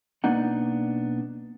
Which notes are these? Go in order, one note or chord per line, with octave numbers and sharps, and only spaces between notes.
B1 A#3 B3 D4 D#4 F#5